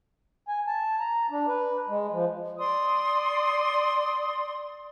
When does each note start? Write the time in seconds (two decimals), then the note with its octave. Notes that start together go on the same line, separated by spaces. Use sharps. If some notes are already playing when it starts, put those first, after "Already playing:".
0.48 G#5
0.67 A5
1.00 A#5
1.30 D4
1.48 B4
1.88 G#3
2.11 F3
2.58 D5 C6 D#6